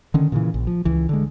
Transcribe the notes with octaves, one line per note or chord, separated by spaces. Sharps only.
D3 D#3 C#4
A#2 C#3 E3
A#1
F3
C#2 E3
D3 G#3